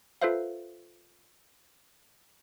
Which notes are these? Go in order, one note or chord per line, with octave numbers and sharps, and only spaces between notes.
F4 A4 B4 C5 E5 F5